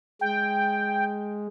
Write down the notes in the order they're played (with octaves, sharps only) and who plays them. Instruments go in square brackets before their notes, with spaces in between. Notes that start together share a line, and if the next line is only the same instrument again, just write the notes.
[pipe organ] G#3 [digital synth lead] G5